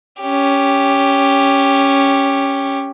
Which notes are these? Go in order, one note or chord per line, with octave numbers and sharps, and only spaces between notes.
C#4 G4